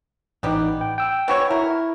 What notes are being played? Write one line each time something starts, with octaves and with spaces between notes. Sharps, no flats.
A1 G3 B3 D#4
G5
G5 E6
B3 F#4 C#5
E4 A#4